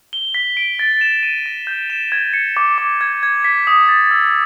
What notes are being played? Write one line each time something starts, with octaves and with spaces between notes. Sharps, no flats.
G7
B6
D7
A6
E7
D#7
A#6
G6
E7
G#6
C#7
D6
D6
G#6
G#6
B6
D#6
A6
E6